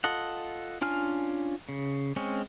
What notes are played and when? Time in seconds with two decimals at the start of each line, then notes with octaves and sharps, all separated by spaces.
0.04 F4 A4 D#5 F#5
0.81 C#4 D4 F4 G#5 F6
1.69 C#3
2.16 G#3 C4 C#4